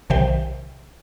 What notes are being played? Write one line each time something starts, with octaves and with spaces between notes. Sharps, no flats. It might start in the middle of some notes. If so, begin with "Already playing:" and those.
B1 C3 D#3 C5 E5 G5